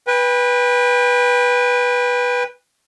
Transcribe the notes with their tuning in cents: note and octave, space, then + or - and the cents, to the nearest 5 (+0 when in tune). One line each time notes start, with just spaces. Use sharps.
B4 -10 G5 +35